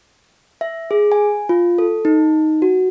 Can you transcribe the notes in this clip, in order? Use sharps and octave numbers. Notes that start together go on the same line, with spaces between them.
E5
G#4
G#5
F4
A4
D#4
F#4